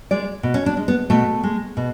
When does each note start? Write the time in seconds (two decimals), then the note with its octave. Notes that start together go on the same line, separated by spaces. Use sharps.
0.11 G#3 D5
0.43 B2
0.54 C#4
0.66 D4
0.77 G#3
0.88 B3
1.10 B2 A3
1.43 G#3
1.77 B2